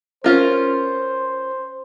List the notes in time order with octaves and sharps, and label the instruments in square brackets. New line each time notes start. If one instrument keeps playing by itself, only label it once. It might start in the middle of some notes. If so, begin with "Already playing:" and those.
[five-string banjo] C#4 F4 A#4 [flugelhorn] C5